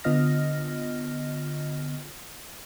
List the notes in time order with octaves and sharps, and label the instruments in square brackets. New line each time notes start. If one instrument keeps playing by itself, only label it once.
[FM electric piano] D3 B3 F4 D#5 F6 A#6